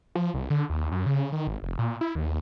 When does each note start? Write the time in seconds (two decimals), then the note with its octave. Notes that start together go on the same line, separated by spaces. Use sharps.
0.15 F3
0.34 C2
0.50 D3
0.70 D#2
0.92 F#2
1.06 C#3
1.32 D#3
1.47 G#1
1.63 F1
1.79 A#2
2.01 E4
2.15 D#2